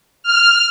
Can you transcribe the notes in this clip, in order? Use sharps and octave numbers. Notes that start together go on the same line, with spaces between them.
F6